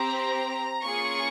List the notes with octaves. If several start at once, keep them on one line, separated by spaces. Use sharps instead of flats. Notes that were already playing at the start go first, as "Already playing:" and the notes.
Already playing: C4 G4 A#5
A#3 C#4 F4 G#4 C#6